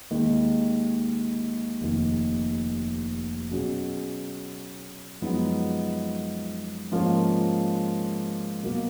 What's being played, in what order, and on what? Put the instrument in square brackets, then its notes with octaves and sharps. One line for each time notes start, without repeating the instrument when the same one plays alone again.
[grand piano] D#2 D#3 G#3
F1 D#2 D#3
B2 F#3 C#4 G#4
F#2 F3 G#3 B3 D#4
G#2 F3 A#3 C#4
B2 F#3 A#3